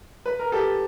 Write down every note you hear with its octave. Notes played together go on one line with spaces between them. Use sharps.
B4
A#4
G4 A4